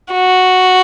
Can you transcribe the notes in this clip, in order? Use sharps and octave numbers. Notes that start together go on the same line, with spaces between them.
F#4